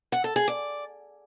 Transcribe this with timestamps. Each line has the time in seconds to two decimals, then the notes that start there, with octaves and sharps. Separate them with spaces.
0.12 F#5
0.24 A4
0.36 G#4
0.48 D5